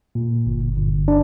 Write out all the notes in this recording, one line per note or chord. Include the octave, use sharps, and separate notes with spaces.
A#2
G1
G1
D4